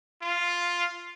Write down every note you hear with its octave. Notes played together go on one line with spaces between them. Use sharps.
F4